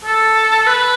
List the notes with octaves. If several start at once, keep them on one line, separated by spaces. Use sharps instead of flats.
A4
B4